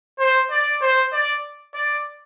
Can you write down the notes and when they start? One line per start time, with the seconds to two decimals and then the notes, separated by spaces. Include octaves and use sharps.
0.19 C5
0.51 D5
0.81 C5
1.13 D5
1.74 D5